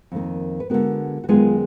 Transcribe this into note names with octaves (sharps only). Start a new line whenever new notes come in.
F2 D#3 A#3
B4
D3 G#3 B3 F#4 A#4
F#4
F#2 D#3 G#3 B3 F4 G#4